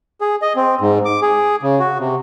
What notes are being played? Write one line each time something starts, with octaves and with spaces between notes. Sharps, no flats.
G#4
D#5
C4
G#2
D6
G#4
C#3
F#4
C3